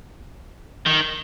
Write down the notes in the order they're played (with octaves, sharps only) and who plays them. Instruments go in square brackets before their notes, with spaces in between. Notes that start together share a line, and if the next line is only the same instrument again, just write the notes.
[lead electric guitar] D#3